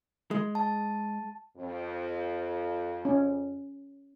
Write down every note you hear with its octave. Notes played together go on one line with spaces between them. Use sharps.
G#3
A5
F2
C#4